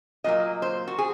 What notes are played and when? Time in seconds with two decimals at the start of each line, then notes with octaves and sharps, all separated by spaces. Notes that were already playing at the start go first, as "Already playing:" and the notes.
0.24 A#2 F#3 A#3 D#5
0.62 C5
0.87 F#4
0.98 G#4